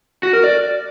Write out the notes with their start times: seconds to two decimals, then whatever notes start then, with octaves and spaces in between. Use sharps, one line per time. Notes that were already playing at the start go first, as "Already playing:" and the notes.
0.23 F#4
0.33 A#4
0.44 D5